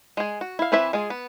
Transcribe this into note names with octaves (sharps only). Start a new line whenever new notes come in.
G#3 G#4
F#4
E4 F5
E3 C4 E4 B4 E5
G#3 F4 G#4
B3